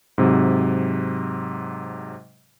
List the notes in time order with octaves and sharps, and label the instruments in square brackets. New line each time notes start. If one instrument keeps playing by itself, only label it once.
[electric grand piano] G#2 C3 F#3